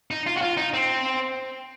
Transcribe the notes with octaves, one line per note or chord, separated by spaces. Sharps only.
D#4
F4
F#4
F4
D#4
C4